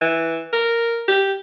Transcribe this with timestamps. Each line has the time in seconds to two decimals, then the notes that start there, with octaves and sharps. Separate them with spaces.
0.01 E3
0.52 A#4
1.08 G4